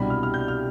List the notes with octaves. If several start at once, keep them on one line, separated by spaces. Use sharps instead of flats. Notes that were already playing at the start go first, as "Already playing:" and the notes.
Already playing: C2 B2 G3 D4 B5
F6
F6
G6
F6